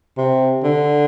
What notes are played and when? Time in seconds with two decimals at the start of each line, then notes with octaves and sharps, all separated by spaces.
0.17 C3
0.63 D3